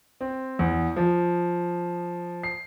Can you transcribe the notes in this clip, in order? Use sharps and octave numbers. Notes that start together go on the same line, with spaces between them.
C4
E2
F3
C7